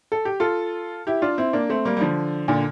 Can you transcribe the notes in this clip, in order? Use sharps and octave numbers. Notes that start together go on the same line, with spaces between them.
A4
G4
F4 A4
E4 G4
D4 F4
C4 E4
A#3 D4
A3 C4
G3 A#3
G3
D3 F3
A#2 D3